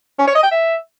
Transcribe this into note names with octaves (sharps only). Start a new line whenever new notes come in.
C#4
C#5
D#5
G5
E5